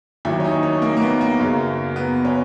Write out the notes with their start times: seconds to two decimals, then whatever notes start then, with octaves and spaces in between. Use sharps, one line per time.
0.25 D#2 D#3 F#3 E4
0.40 C#4
0.44 D#4
0.63 C#4
0.82 A#3
0.97 A#3
1.02 B3
1.21 A#3
1.39 F#2 C#3 F#3
1.96 B3
2.25 C#4